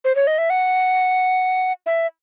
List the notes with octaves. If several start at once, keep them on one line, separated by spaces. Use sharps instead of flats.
C5
C#5
D#5
E5
F#5
E5